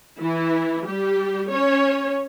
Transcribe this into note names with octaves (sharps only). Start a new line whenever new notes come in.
E3 E4
G3 G4
C#4 C#5